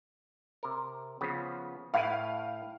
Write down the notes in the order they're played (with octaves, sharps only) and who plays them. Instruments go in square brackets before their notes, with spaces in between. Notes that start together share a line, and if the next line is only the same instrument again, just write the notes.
[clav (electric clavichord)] C3 A#4
C#3 F3 B3
[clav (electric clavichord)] A2 E4 B4 [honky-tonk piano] F5